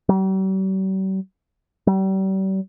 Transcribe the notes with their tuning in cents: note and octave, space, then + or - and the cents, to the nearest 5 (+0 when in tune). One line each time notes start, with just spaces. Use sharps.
G3 -45
G3 -40